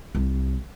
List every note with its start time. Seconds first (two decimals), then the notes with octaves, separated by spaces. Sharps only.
0.15 C2